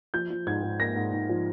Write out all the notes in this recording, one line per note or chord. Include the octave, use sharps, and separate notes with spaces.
F3 G6
F3
G#2 G#6
G#2
A#3 A#6
G#2
G#2
F3